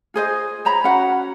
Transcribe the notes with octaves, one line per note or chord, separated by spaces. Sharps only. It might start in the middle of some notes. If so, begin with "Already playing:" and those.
F4 G#4 C5 D#5
C5 C#5 A#5 B5
C#4 F#4 F#5